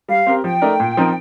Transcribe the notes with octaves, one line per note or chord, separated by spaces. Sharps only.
G3 F5
C4 G4 A#4
F3 G5
A3 D#4 A#4 D5
A#2
F3 C4 D#4 A#4